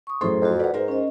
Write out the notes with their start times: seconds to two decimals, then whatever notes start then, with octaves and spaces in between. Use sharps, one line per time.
0.07 C#6 D#6
0.21 F#2 A2 G#4 A4 C5 C6
0.42 F2 F#4 A4
0.59 B4 D5 F#5
0.74 G#2 A#4 C5
0.88 C#4 D#5